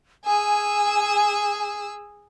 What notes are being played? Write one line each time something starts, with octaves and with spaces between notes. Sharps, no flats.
G#4 G#5 E6